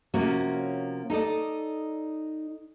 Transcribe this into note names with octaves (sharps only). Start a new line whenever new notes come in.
C3 F3 A#3 C#4 F#4 C#5
D#4 A4 D5 D#5